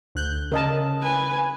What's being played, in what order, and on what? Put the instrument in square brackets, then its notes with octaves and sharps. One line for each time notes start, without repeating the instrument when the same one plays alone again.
[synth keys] D2 F#6 G6
[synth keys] C#3 [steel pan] A#4 D#5 A5
[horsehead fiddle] B4 G#5